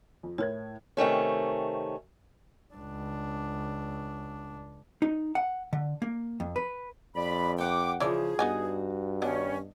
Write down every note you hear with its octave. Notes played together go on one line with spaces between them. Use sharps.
F2
A2 E4 A#4 C#5 G#6
C3 D#3 A3 C#4
C#2 D4
D#4
F#5
D3
A#3
F2
B4
F2 D5 B5
F#5 G5 D6
C#3 E3 F3 G#4 D5
G2 B3 D#4 F#4 G#5
D#3 G3 B3 C#4 D4 D#5